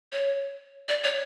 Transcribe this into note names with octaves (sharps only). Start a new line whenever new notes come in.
C#5
D5
C#5